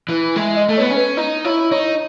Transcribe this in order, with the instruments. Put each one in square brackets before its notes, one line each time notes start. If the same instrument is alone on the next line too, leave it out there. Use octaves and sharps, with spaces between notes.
[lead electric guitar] E3
[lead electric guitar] G#3 [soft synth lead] E5
[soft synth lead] D#5
[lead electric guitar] A3
[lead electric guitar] B3 [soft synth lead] C#5
[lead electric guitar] C#4
[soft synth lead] B4
[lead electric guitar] D#4 [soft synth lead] D#5
[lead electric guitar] E4 [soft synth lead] C#5
[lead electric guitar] D#4 [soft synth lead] C#5